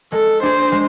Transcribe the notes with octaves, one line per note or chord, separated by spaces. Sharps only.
G#3 A4
D4 G#4 C5
G#3